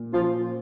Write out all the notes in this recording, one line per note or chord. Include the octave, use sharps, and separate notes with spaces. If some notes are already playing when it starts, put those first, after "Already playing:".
Already playing: A#2
F3 C#4 F4